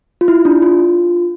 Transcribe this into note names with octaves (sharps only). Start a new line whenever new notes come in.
F4
E4
D4
F4